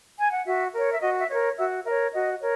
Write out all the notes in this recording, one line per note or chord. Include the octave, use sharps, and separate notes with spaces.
G#5
F#5
F#4 E5
A#4 C#5
E5
F#4 D#5
E5
A#4 C#5 D#5
F#4 E5
A#4 C#5 E5
F#4 D#5
A#4 C#5